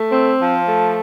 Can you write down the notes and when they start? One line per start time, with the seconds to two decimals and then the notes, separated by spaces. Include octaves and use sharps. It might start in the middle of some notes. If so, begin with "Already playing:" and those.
Already playing: A3
0.12 C4
0.39 F3
0.66 A3